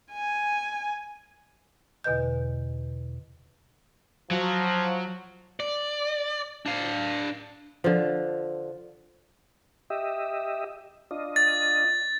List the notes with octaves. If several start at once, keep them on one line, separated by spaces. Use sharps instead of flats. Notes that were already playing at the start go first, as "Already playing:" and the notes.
G#5
E2 B2 D3 B4 D#5 G6
F3 F#3
D5
D4 F5
D3 F3
G4 D#5 E5
D4 F4 D#5
A6